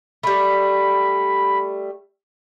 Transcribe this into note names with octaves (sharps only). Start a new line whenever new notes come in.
G3 A3 B5